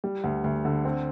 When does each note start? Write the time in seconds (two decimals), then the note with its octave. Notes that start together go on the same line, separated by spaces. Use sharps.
0.04 G3
0.24 D2
0.44 D2
0.65 D3
0.85 C4